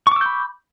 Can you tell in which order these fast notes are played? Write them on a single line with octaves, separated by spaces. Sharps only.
C#6 D6 E6 G6 B5